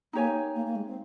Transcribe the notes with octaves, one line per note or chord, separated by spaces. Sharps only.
A#3 D#4 G4 C#5 G#5
A#3
A#3
G#3
C4